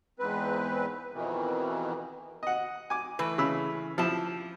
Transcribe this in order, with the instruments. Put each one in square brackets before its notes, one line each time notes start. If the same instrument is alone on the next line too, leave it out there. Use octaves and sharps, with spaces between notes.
[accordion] E2 G#2 C4 B4
F2 B2 D#3 E3
[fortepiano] D#5 F#5
G#5 D6
[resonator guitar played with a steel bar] E3 A3 B4
[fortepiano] C#3 B5 E6
[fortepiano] F3 E4 [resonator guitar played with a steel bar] G4 A5